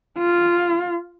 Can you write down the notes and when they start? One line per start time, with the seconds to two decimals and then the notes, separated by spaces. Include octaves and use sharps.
0.18 F4